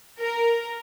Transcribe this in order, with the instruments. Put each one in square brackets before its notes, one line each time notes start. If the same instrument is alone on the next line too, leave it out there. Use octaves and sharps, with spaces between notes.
[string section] A#4